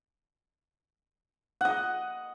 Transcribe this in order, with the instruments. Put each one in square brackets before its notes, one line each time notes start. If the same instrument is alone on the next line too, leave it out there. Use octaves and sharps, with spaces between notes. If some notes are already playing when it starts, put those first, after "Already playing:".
[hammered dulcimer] D#5 F#5